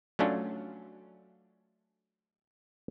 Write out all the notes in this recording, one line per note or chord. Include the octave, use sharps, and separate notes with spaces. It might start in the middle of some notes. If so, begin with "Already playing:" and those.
F#3 A3 C#4 D4 F4